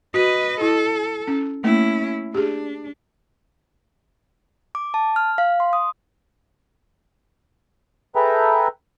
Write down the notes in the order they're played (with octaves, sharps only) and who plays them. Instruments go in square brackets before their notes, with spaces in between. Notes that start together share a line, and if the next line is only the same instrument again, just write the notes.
[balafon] F#4 [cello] B4 D#5
[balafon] E4 [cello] A4
[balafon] C#4
[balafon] A3 A#3 [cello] C#4 E4
[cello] D4 [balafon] G4 G#4
[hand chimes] D6
A5
F6
F5
C6
D#6
[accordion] G#4 A4 B4 E5 G5 A#5